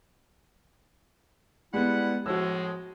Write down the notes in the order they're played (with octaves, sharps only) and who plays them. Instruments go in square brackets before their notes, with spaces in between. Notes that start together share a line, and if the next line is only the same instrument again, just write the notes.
[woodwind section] G3 E4 F#5 [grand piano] G#3 B3
[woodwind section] A2 F3 G#3 [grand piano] F#4 E6